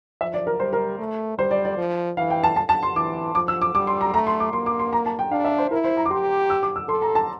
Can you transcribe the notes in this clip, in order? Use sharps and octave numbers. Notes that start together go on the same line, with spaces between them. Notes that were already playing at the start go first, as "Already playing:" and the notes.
F3 E5
D5
A#4
G3 C5
A#4
A3
G3 C5
D5
D5
F3
E3 F5
G5
A5
A5
A5
C6
E3 D6
F3 D6
E6
D6
G3 D6
C6
A#5
A3 A#5
C6
D6
A#3 C6
D6
C6
A#5
A5
G5
D4 F5
E5
C5
E4 A#4
C5
A#5
D6
G4 C6
E6
D6
E6
A4 C6
A#5
A5